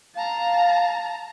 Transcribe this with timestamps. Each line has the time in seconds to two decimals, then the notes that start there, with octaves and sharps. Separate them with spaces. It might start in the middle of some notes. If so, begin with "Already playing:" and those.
0.15 F5 A5 A#5